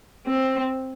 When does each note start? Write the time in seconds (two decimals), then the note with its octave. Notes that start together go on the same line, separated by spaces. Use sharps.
0.27 C4